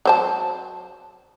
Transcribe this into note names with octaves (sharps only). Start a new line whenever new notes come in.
F#3 C5 A5